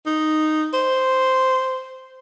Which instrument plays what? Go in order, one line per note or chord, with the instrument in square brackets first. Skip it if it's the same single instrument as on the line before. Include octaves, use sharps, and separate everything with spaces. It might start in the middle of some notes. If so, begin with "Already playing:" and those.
[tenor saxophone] D#4
C5